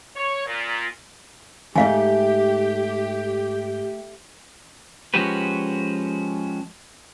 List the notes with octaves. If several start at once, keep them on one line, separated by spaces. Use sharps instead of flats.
C#5
A#2
F2 G#2 A3 G4 D#5 F5 G#5
F3 G#3 C#4 F#4 G4 B4